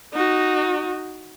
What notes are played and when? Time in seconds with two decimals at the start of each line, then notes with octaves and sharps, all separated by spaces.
0.13 D#4 F#4